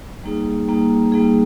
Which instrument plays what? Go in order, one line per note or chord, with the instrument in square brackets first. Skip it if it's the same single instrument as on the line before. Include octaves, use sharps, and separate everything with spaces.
[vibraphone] G3 A#3 D#4 G#4
G3 A#3 D#4 G#4
G3 A#3 D#4 G#4